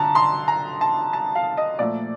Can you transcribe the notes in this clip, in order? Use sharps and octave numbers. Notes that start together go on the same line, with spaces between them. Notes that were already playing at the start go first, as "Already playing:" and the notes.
Already playing: D3 A5 A#5
C6
A#5
A5
A5
F5
D#5
A#2 F3 A3 D5